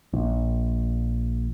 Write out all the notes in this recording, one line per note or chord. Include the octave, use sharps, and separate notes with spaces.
A#1